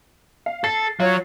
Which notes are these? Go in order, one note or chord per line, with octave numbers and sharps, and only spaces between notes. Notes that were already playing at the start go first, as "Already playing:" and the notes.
F5
A4 A6 C7
F#3 F4 C#5